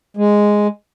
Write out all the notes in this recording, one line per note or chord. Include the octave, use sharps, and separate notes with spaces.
G#3